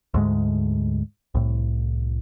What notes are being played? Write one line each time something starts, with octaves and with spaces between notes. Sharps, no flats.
D2 G#2 G#3
C2 A2